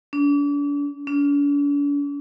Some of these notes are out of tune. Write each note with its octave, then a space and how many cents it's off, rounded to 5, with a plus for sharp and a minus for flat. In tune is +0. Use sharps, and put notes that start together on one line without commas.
D4 -40
D4 -45